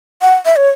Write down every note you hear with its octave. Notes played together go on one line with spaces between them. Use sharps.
F#5
E5
C#5